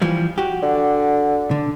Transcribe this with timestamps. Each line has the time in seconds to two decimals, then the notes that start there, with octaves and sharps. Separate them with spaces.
0.02 E3 F3 G3
0.38 F#4 G4
0.63 D3
1.51 D3